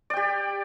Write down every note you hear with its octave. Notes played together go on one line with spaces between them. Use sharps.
G4 D5 G5